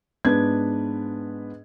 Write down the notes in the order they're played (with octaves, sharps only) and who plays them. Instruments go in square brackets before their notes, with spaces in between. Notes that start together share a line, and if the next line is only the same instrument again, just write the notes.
[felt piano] G#2 B3 D4 B4 G#6